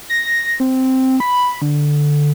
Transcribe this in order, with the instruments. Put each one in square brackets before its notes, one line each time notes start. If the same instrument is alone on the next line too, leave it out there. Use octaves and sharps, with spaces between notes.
[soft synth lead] A#6
C4
B5
D3